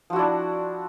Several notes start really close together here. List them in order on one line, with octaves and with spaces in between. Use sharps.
F3 F#4 E4 D4